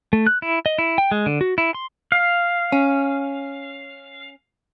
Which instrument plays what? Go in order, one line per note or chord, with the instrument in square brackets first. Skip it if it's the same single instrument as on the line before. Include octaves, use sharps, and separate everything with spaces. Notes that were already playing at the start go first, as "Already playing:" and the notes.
[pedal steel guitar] A3
F#6
E4
D#5
E4
G5
G#3
D3
F#4
E4
C6
F5
[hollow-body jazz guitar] C#4